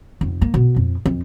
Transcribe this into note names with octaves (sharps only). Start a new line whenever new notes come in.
F1
A#3
B2
F2
F2